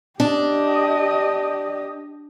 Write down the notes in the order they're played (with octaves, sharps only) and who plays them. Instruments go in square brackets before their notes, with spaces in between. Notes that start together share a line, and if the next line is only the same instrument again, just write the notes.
[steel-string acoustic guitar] D4 [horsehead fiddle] G4 D#5